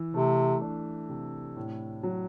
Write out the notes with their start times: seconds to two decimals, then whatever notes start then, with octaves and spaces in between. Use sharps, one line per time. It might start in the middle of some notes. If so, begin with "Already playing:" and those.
Already playing: E3
0.14 C3 A3
0.62 D4
1.09 C3
1.57 A2
2.03 F#3